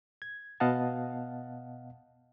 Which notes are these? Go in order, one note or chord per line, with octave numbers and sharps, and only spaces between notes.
G#6
B2 B3 D#5 F5 F#5 A5